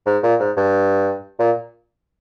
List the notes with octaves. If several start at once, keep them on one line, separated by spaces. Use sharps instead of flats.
G#2
A#2
G#2
G2
A#2